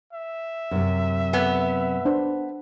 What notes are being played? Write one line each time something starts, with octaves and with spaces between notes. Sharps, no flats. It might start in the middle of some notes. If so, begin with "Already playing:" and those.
E5
F#2 C3
B3 G#5
D4 C5